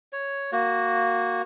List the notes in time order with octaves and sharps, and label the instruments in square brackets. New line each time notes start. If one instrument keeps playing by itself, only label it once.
[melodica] C#5
A#3 F#4